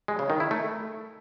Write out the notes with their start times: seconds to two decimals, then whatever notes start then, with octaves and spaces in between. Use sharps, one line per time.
0.08 G#3
0.19 C#3
0.30 D#3
0.40 E4
0.51 A3